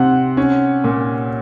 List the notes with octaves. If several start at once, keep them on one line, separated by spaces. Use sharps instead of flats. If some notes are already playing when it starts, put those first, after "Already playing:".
Already playing: C3 C4 F#5
C#4
A#2